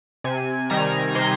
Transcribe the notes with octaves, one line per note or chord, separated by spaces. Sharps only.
C3 G#5
D#3 G3 A#5
C3 C6